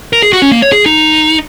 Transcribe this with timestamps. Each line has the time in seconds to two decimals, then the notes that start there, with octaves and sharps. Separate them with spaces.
0.13 A#4
0.23 G#4
0.33 F#4
0.42 C#4
0.52 A#3
0.62 C#5
0.72 G#4
0.86 D#4